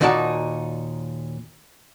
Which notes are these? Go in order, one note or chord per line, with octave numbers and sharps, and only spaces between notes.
D#2 A#2 D#4 F#4 D5 A5